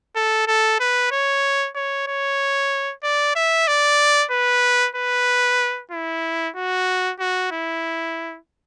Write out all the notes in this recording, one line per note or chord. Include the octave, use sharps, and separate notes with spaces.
A4
A4
B4
C#5
C#5
C#5
D5
E5
D5
B4
B4
E4
F#4
F#4
E4